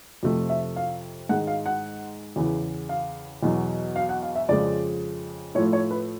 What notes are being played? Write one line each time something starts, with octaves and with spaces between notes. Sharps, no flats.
F2 C3 F3 A3
E5
F5
G#2 D#3 G#3 F#5
F5
F#5
E2 C#3 E3
F5
E2 B2 F#3
F5
F#5
F5
E5
F2 C#3 F3 G#3 D5
A2 F3 A3 C#5
C#5
B4